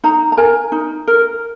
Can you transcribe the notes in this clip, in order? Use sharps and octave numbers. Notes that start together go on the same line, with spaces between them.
D#4 A#5
A#5
A#4 G#5
D#4
A#4